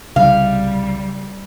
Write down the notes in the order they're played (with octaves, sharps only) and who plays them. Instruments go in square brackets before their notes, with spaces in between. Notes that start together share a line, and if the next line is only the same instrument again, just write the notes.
[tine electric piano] C2 [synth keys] C#3 [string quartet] G3 [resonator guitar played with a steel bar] F5